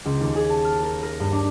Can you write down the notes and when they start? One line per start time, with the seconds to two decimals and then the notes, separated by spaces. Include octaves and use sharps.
0.05 C#2
0.21 D#2
0.35 G#4
0.50 A5
0.65 F6
0.83 A#4
1.03 A#4
1.20 G2
1.32 D4